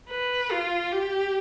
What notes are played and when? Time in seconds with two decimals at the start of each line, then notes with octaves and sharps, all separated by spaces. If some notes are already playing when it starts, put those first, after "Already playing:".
0.10 B4
0.51 F4
0.92 G4